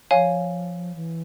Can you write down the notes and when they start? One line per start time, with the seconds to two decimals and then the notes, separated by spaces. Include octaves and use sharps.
0.11 F3 C#5 F5 G#5
0.95 E3